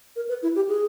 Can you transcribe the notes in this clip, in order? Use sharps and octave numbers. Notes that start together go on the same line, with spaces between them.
A#4
B4
E4
G4
G#4